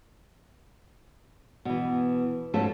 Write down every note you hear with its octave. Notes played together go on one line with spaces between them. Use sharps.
B2 E3
G#2 F3 A3 C#4 F4 A4